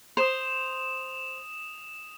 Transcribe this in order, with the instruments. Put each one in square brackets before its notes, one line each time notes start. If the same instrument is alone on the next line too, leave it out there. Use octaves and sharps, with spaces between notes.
[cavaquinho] C5 [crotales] D#6 E7 F7